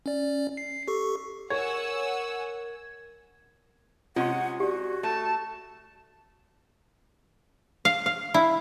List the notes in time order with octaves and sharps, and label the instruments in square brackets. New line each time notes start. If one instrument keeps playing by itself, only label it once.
[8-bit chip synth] C#4 D5
C7
G4 A4 C#6
[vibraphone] A#4 [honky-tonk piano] C#5 [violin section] F#5 G#5 E6 [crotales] G#6
[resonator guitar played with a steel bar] C3 G#3 C#4 [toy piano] F4 C6 [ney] F#5
[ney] F#4 [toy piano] G4 D5
[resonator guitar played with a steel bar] A3 [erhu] A5
[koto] F5
F5
E4